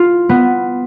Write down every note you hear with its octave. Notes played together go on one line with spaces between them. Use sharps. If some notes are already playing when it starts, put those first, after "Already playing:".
Already playing: F4
B3